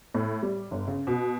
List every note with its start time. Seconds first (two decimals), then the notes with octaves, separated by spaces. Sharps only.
0.14 A2
0.43 G3
0.71 G1
0.88 C#3
1.07 B2